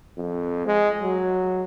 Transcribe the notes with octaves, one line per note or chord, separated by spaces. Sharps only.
F2
G#3
F#3